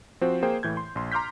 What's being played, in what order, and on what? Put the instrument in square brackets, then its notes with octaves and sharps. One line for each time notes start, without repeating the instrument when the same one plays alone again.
[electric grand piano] F3 C4 F#4 C5
A#3 G#4 C5 G5
A2 E3 G6 G#6
C6
A#1 C6
A#5 C6 D6 F6 G6 B6